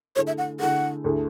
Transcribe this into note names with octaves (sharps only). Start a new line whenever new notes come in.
D3 A3 E4 G#4 C#5
E5
F#5
D3 A3 E4 G#4 F#5
D2 D3 A3 E4 G#4